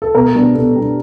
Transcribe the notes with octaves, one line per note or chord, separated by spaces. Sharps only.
A4
B2 A#4
G3 B3 D4
B2 A4
G3 B3 D4